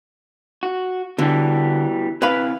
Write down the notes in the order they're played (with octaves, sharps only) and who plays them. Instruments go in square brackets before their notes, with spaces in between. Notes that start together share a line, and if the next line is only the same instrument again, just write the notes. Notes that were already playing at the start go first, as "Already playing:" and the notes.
[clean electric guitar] F#4
[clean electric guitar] B2 E3 G3 [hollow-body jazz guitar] D3
[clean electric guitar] C3 E3 F5 [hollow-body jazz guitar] B4 B5